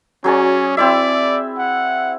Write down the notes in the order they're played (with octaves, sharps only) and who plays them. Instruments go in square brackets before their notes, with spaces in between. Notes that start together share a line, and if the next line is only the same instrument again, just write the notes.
[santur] F#3 G#4 D5 [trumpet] C#4
[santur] C4 E4 E5 [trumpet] D5
[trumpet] F#5